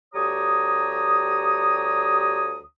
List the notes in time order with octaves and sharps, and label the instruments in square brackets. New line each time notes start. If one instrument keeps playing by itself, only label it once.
[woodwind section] D2 G3 G4 C#5 A#5 D#6